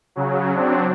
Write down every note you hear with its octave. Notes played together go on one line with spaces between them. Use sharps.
C#3 F#3
F#3 C4 D4